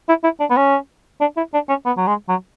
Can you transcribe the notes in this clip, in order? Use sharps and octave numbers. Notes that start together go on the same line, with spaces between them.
E4
E4
D4
B3
C#4
D4
E4
D4
C#4
B3
F#3
G#3
F#3